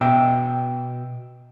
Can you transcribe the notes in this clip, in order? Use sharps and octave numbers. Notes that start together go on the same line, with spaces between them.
B2 D#5 E5 G5